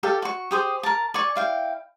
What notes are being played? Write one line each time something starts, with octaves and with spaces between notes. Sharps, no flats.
G4 A4 D5 F5
F#4 C#6
G4 G#4 C5 D#6
A#4 A5
D5 G#5 C#6
E4 F5 G5